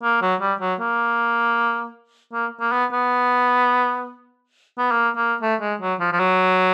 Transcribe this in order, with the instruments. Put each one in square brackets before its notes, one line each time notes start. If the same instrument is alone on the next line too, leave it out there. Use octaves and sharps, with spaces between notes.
[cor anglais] A#3
F#3
G3
F#3
A#3
A#3
A#3
B3
B3
B3
A#3
A#3
A3
G#3
F#3
F3
F3
F#3